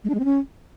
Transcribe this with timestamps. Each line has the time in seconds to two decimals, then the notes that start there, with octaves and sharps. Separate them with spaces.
0.04 G#3
0.09 D4
0.14 G#3
0.19 C4
0.25 C#4